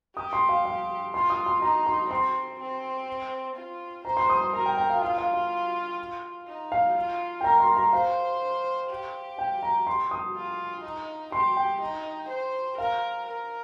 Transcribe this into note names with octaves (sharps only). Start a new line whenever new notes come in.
G4 D#6
C6
F5
F5
F4 C6
D#6
C6
D#4 A#5
C6
C4 C6
C4
F4
C5 A#5
C6
D#6
C6
A#4 A#5
G5
G5
F5
F4 F5
F5
F5
D#4
F5
F4
G5
A#4 A#5
C6
A#5
C5 F5
G4
G5
A#5
C6
D#6
F4
D#4
G4 C6
G5
D#4
C5
A#4 F5
A#4